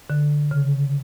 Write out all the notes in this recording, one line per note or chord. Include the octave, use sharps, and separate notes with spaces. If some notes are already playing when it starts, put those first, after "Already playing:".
D3
C#3